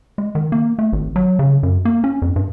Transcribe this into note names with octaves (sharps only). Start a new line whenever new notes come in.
G#3
D#3
A#3
A3
G#1
F#3
C#3
F#2
A#3
C#4
F2
G2